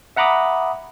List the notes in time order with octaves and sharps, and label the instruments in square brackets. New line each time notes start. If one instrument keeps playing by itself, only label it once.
[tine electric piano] E5 F#5 A#5 B5 D6 D#6